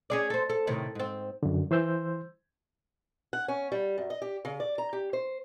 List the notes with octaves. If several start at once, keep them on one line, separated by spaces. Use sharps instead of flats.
C#4 G#4 D5
A4 C5
A4
A2 C3 D#3
G#2 C4
F#2 D3
E3 C5 C6 E6 G6
F#5
C#4
G3
F#2
D#5
G4
C#3
D5
A#5
G4
C5